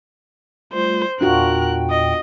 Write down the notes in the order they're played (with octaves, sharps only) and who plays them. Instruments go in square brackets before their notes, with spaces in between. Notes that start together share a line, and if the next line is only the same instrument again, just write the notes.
[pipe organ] G3 A3 F4 [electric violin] C5
[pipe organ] E2 A#2 G5 [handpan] D4 F4 F#4 [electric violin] A#4 F#6
[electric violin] D#5